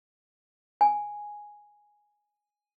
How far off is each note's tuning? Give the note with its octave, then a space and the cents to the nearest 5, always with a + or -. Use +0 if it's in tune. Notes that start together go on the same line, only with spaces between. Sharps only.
G#5 +0